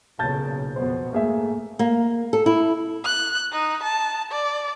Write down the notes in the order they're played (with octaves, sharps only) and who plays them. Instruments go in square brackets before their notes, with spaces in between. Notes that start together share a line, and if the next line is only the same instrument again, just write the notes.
[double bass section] B1 A#2 C#3 [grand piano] A5 G6 A6
[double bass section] F2 B2 B3 [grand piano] C5
[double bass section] G#2 A3 [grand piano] A#3 G#4 E5
[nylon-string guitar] A#3
A4
E4
[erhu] F#6
D#4
A5
D5